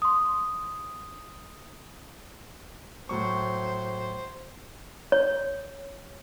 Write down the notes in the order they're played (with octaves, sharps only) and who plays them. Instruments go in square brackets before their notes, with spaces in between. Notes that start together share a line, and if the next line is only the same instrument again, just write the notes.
[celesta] C6 D#6
[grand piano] A2 F#3 C#6 [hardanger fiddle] C5
[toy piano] C#5